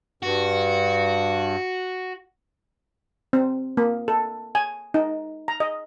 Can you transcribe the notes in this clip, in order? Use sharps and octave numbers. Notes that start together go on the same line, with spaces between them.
G2 F#4
C4
A#3
A4
G#5
D#4
A#5
D#5